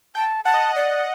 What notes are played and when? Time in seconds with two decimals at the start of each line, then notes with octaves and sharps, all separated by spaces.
0.15 G5 A5
0.45 F#5 A5
0.54 D#5
0.64 F#5
0.75 D5 D#5